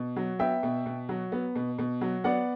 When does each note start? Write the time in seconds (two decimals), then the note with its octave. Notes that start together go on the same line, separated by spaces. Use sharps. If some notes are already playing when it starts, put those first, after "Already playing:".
Already playing: B2
0.16 F#3
0.39 B3 E5 G5
0.63 B2
0.86 B2
1.09 F#3
1.32 B3
1.55 B2
1.78 B2
2.01 F#3
2.24 B3 D5 F#5